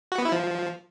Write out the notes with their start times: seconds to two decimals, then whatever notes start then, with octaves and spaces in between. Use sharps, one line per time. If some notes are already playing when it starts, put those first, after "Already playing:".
0.12 F#4
0.18 B3
0.25 E4
0.32 F3